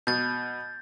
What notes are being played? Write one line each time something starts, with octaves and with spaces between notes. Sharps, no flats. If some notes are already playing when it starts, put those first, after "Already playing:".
B2 G6 A6